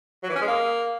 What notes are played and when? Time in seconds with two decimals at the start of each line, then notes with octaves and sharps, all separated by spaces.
0.23 F#3
0.29 E3
0.36 C#4
0.42 G#3
0.48 A#3